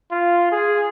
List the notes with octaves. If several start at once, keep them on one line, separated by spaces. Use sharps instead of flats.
F4
G#4